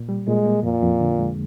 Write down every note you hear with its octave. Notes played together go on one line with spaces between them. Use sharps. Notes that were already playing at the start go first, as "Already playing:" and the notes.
Already playing: A#2
G3
A#2 G#3
A#3
F2 A#2
F2
D3
G#3